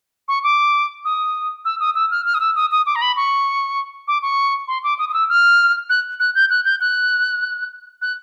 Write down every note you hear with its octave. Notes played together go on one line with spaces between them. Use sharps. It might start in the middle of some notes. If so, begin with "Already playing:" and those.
C#6
D6
D#6
E6
D#6
E6
F6
F6
D#6
E6
D#6
D#6
D6
A#5
B5
C#6
D6
C#6
C6
D6
D#6
D#6
E6
F6
F#6
F#6
G6
F#6
G6
F#6
F#6